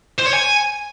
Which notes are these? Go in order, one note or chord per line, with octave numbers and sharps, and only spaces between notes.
C5
C#5
G#5